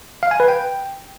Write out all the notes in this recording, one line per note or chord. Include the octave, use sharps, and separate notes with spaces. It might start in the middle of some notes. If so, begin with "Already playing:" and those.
F5
G#5
B4
G5